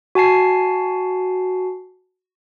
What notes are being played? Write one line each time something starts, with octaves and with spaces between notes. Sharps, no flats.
F#4 G#5 A5 C7